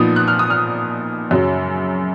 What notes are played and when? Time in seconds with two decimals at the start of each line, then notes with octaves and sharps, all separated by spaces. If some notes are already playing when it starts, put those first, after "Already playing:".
Already playing: A#2 F3 B3 D#4 D#6
0.16 F#6
0.28 F6
0.39 D#6
0.50 F6
1.31 F#2 C#3 F#3